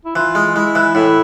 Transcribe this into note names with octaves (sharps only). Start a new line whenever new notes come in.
E4
E3 F4
G#3
G#3 E4
E3
A2 E4